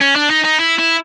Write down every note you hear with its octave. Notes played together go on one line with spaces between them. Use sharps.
C#4
D4
D#4
D#4
E4
E4